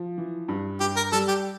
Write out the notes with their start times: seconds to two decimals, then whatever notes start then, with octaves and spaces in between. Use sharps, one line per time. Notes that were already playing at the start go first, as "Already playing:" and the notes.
Already playing: F3
0.18 E3
0.48 G2
0.80 G2 G4
0.96 A#4
1.12 G3 A4
1.28 G4